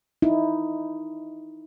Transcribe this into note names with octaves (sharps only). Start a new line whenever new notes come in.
D#4 E4